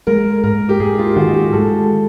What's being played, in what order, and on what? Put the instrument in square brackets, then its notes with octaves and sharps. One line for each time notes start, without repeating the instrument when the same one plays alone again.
[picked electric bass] G#3 [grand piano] A#4
[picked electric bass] G#2 [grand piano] A#4
[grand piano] G4
[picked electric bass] G#2 [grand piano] G#4
[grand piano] F4
[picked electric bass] D#3 [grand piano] F#4
[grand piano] G4
[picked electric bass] G#3 [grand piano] A4